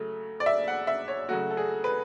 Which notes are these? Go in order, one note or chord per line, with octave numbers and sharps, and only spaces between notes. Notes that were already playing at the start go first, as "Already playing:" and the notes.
Already playing: C#3 F#3 A3
D5
E5
F#5
E5
C#5
C#3 F#3 A3 F#4
A4
G#4
B4